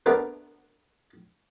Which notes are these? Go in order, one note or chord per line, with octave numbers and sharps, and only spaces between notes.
A3 B3 D4 A#4 B4